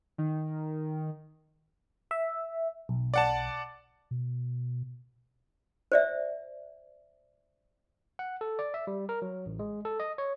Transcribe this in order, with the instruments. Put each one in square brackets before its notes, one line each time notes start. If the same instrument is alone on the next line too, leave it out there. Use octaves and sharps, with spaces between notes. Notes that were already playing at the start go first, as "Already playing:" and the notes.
[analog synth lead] D#3
[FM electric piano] E5
B1
[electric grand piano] D5 F#5 A5
[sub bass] B2
[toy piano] C5 D5 E5
[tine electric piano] F#5
A4
D5
E5
G3
A#4
F#3
A1
G#3
A4
D#5
C#5